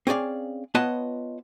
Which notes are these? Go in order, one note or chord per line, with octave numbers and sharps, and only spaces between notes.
C4 C#4 G#4 D5 F5
B3 F4 B4 C#5 D#5 A5